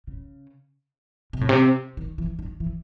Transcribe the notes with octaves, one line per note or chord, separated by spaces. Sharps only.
C#3
C3
A2
C3
D#3
E3
D#3
E3